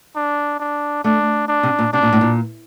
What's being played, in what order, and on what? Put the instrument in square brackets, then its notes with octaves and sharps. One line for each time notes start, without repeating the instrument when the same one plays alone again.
[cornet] D4
D4
[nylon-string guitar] A3 [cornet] D4
[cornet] D4
[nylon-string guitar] C3
A#2
[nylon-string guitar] C3 [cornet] D4
[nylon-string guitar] A#2
A2
A#2